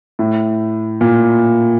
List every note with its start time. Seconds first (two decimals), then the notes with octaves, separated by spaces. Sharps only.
0.19 A2
1.01 A#2